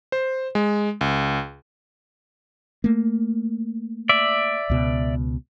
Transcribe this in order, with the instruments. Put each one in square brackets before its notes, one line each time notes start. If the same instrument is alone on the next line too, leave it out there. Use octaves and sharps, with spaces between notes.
[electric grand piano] C5
G#3
C#2
[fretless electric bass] A3 A#3
[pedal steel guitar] D5 E5
[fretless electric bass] C#2 B2